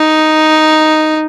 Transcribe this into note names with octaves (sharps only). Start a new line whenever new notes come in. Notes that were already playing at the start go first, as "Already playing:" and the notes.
Already playing: D#4